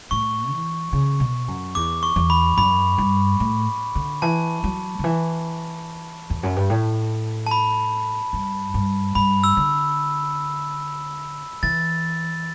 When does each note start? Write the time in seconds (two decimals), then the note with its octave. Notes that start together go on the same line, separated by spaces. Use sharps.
0.11 A2 C#6
0.52 E3
0.93 C#3
1.20 B2
1.48 F#2
1.75 E2 D6
2.03 C#6
2.16 E2
2.30 B5
2.57 F#2 B5
2.98 G2
3.40 A2
3.95 D3
4.22 E3 A5
4.64 F#3
4.99 D3
5.04 E3
6.30 E2
6.43 F#2
6.56 G2
6.70 A2
7.47 A5
7.51 B5
8.33 G2
8.74 G2
9.15 G2 B5
9.44 E6
9.57 D3
11.63 E3 A6